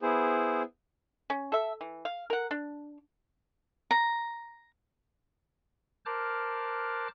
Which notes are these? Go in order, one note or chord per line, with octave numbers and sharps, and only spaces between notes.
B3 E4 G#4 C5
C#4
A4 E5
E3
F5
A#4 F#5
D4
A#5
A#4 C5 A5 D6 F6 F#6